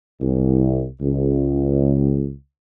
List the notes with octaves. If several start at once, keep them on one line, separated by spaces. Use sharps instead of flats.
C2
C#2